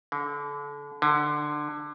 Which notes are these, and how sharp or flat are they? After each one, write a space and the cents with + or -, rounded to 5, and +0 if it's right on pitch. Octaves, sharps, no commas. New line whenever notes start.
D3 -35
D3 +15